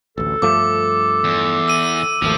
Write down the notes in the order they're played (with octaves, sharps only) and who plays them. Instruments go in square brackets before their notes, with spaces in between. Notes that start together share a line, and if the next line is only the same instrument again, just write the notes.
[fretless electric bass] A1 D2 [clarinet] A4
[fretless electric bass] G2 F3 A3 [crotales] D6
[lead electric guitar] E2
[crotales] E6 D#7
[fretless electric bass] G#1 D#2 A3 [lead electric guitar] F3